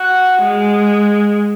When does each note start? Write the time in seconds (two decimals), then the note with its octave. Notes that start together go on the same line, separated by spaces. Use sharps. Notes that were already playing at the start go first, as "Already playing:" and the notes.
Already playing: F#4
0.42 G#3